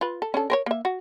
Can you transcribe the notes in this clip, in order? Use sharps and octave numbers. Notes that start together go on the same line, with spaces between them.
F4 B4
A4
C#4 D4 A4
A#4 C5 C#5
A#3 E5
F#4